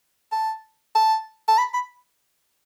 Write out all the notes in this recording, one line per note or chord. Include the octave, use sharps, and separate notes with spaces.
A5
A5
A5
B5
B5